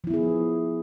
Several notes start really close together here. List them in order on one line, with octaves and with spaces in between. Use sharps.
F3 E4 B3 G#4